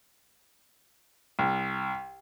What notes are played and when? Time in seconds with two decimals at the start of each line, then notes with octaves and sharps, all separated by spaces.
1.39 C2